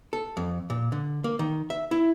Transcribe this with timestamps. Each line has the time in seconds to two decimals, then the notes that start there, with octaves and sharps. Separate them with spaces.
0.13 A4
0.37 F2
0.70 A#2
0.92 D3
1.24 A#3
1.39 D#3
1.70 E5
1.91 E4